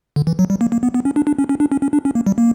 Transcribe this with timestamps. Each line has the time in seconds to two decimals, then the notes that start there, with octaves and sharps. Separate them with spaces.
0.16 D3
0.27 E3
0.39 F#3
0.50 G3
0.61 A#3
0.72 A#3
0.83 B3
0.94 B3
1.05 C#4
1.16 D4
1.27 D4
1.39 C#4
1.49 C#4
1.60 D4
1.72 C#4
1.82 C#4
1.93 D4
2.05 C#4
2.15 A#3
2.26 G3
2.38 A#3